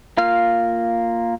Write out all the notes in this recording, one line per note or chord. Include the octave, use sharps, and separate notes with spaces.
A#3 F4 F5 F6